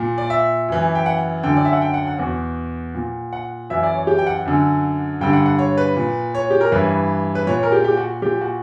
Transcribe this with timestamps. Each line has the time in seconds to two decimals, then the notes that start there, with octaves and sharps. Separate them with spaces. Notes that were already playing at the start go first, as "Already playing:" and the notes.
Already playing: A#2
0.18 D5
0.30 E5
0.68 F#2 E3
0.95 G5
1.06 F#5
1.43 F#2 D3 G5
1.57 D5
1.65 E5
1.73 F#5
1.82 G5
1.94 F#5
2.07 F#5
2.19 E2 B2 F#5
2.95 A#2
3.33 F#5
3.70 F#2 E3 E5
3.83 D5
3.95 C#5
4.07 G4
4.18 G5
4.27 F#5
4.45 F#2 D3
5.21 G2 D3 G5
5.33 F#5
5.46 F#5
5.59 C#5
5.77 B4
5.96 A#2
6.35 C#5
6.51 G4
6.61 A#4
6.72 G2 E3 B4
7.35 B4
7.47 A#2 C#5
7.63 A#4
7.72 G4
7.84 G4
7.97 F#4
8.22 A#2 G4
8.41 F#4